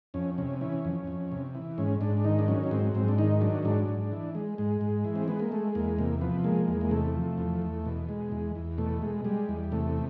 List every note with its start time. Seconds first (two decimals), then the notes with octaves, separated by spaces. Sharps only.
0.14 F2 C#4
0.38 C3 C#4
0.61 E3 C#4
0.85 F2
1.07 F2
1.32 C3
1.55 E3
1.78 G#2 C#4
2.01 G#2 D4
2.17 D4
2.24 D#3 D#4
2.39 D4
2.48 F#3 C#4
2.64 C#4
2.71 G#2 C4
2.95 G#2 C4
3.08 D4
3.18 D#3 D#4
3.41 F#3 D4
3.65 G#2 D4
3.88 G#2
4.12 E3
4.35 G#3
4.58 G#2 G#3
4.81 G#2
5.05 E3
5.16 C4
5.28 G#3 B3
5.40 A#3
5.51 G#3 A3
5.75 E2 A#3
5.98 C3 A#3
6.21 F3 B3
6.44 G#3 A#3
6.68 E2
6.81 A#3
6.91 C3 A3
7.14 F3
7.38 E2
7.62 E2
7.86 B2
8.09 G#3
8.32 E2
8.55 E2
8.78 B2 A3
9.02 G#3
9.24 G3 G#3
9.49 E2
9.72 C3 A3